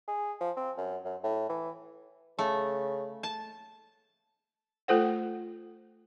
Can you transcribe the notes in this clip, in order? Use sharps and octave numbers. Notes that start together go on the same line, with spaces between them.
G#4
F3
C4
F#2
F#2
A2
E3
C#3 A3
A5
A3 F4 A4 C5 F#5